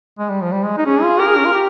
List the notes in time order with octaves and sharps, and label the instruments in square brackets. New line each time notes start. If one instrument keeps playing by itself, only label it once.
[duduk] G#3
G3
F3
G3
G#3
D#4
[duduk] C#4 [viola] G#4
[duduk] F4
[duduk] G4 [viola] A#4
[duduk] G#4
C#4
F4
G4